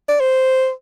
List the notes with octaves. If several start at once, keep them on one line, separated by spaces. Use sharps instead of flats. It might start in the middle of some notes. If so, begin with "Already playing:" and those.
D5
C5